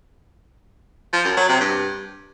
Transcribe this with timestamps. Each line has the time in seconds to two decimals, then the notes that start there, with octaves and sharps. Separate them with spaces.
1.13 F3
1.25 F#2
1.37 F#3
1.49 C3
1.61 G2